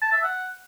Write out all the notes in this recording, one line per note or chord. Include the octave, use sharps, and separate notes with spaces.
A5
E5
F#5